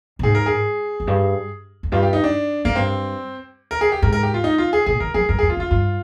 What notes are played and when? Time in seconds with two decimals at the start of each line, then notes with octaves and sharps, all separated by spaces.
0.19 A#2
0.23 G#2 G#4
0.35 A#4
0.46 G#4
1.00 F2
1.07 G2
1.83 F2
1.92 G2 F4
2.03 G4
2.13 D#4
2.24 D4
2.65 G#2 A#3
2.76 G2 C4
3.71 A#4
3.81 G#4
3.92 G4
4.02 G#2 A#4
4.12 A#4
4.23 G4
4.34 F4
4.44 D#4
4.58 F4
4.73 G#4
4.86 A#2 G#4
5.00 D#3 A#4
5.14 F3 G#4
5.29 G2 A#4
5.39 G#4
5.43 F2
5.50 F4
5.57 G2
5.60 F4
5.71 G2 F4